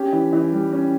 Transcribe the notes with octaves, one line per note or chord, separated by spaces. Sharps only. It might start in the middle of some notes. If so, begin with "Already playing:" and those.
Already playing: C#4 G4
E3
E3
G3
C#4